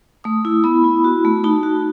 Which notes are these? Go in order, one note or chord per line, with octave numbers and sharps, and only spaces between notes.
A3 D#6
E4
B3 B5
E4
F#4
A3
D#4 A5
F#4